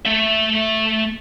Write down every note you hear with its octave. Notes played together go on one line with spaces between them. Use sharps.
A3 E5